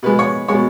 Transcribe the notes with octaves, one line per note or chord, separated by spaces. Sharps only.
B2 G#3 B4
C#5
B2 G#3 C#5